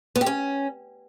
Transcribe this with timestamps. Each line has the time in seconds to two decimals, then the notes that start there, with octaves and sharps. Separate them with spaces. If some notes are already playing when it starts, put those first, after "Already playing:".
0.16 B3
0.21 G4
0.26 C#4